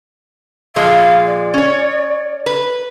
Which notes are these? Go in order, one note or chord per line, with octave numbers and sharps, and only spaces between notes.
A#2 F3 G#3 F5
D5
C#4 C#5
B4